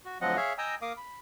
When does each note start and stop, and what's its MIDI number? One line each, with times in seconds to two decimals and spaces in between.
0.05 0.18 66
0.21 0.37 38
0.21 0.37 53
0.21 0.37 54
0.21 0.37 60
0.21 0.37 75
0.21 0.37 78
0.37 0.53 68
0.37 0.53 73
0.37 0.53 76
0.37 0.53 77
0.58 0.75 75
0.58 0.75 79
0.58 0.75 80
0.58 0.75 82
0.58 0.75 87
0.58 0.75 88
0.82 0.93 58
0.82 0.93 70
0.82 0.93 77
0.82 0.93 86
0.82 0.93 87
0.97 1.19 83